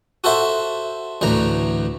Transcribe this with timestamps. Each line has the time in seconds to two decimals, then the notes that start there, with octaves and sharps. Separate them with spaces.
0.24 F#4 A4 C5 E5
1.21 D2 A2 E3 A#5